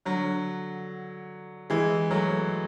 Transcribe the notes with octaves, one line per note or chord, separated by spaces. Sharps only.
D3 F#3
E3 G#3
F#3 A3